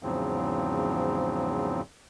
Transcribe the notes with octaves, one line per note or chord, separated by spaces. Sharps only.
E2 G#2 C#3 F3 F#3 C4